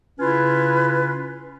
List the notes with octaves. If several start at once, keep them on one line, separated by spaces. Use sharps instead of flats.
C#3 C#4 E4 F4 B4